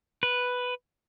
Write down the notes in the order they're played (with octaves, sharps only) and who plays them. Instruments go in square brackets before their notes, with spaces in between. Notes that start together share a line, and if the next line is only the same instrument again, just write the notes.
[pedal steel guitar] B4